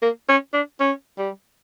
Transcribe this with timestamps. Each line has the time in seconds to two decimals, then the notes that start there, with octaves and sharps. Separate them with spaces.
0.02 A#3
0.29 C#4
0.54 D4
0.80 C#4
1.18 G3